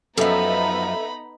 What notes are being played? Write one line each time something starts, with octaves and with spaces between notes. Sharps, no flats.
F#2 F3 B3 D#4 A4 E5 A#5 B5